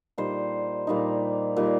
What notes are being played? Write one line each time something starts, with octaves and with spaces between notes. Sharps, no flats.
A#2 G3 D#4 C5
A#2 G3 D#4
A#2 G3 D#4